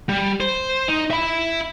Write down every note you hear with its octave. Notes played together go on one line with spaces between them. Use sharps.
G3
C5
D#4
E5 B5